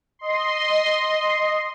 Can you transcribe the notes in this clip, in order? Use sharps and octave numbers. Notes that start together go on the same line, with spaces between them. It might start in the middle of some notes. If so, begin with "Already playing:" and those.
D#5 C6